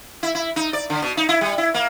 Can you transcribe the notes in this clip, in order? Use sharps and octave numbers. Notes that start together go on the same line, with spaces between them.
E4
E4
D#4
D5
D3
B2
D#4
E4
G3
E4
A#3